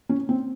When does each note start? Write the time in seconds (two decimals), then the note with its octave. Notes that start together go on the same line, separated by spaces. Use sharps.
0.09 C#4
0.29 C4